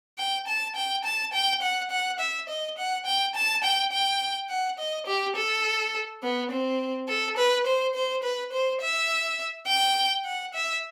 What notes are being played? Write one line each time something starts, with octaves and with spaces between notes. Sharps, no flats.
G5
A5
G5
A5
G5
F#5
F#5
E5
D#5
F#5
G5
A5
G5
G5
F#5
D#5
G4
A4
B3
C4
A4
B4
C5
C5
B4
C5
E5
G5
F#5
E5